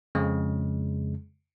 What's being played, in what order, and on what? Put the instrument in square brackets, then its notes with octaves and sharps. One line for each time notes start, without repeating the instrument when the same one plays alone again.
[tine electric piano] F2 C#3 G#3